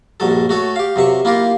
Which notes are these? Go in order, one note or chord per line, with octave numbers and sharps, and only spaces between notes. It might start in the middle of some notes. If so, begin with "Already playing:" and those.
A#1 G2 F#3 A4
A3 F#4 A4 C#5
G4 F5
F#2 C3 E5 C#6
A#3 E4 F4 G4 A#4